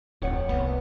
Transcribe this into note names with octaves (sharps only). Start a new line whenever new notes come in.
D1 F2 C#5 F#5
C2 B3